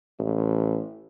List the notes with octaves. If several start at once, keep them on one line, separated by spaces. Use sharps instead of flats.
A1